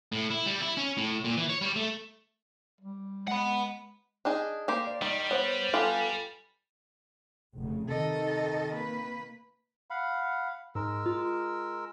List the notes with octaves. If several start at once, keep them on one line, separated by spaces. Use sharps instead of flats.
A2
E4
G3
E4
C#4
A2
A#2
E3
C#5
G3
A3
G3
G#3 F#5 B5
D4 D#4 G#4
A#3 G4 C5
D5
D#3 G3
B3 C5 C#5
B3 F4 G4 A4 G5 G#5
F1 C#3
C3 D#3 A4 D#5
A#3 B4
F5 F#5 B5
G#2 G#3 A#4 E6
F4